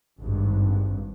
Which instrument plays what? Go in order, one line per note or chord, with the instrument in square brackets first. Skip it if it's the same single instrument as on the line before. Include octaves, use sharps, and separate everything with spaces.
[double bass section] G#1 G2